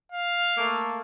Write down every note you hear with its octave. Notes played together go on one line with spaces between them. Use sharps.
F5
A3 A#3